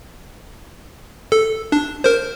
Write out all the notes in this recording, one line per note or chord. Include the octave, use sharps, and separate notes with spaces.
A4
D4
A#4 C5